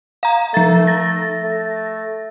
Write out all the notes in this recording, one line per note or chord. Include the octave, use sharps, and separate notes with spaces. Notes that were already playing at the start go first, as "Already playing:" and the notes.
F5 A#5
F3 A3 A6
A6 A#6
A3